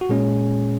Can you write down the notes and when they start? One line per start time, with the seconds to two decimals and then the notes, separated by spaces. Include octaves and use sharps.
0.01 F#4
0.09 A#2 G#3 C#4 G#4